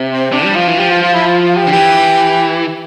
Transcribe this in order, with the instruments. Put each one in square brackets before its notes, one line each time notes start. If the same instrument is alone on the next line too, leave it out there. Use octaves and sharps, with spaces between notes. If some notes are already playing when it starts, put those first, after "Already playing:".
Already playing: [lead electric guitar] C3
[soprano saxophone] C4
[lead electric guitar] C3 [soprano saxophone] D4
[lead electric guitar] G3
[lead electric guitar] F3 [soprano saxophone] F4
[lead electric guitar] E3
[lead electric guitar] F3 [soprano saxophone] G4
[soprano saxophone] F4
F4
E4
F4
F4
G4
[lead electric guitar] D3
[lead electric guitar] E3 [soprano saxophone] G4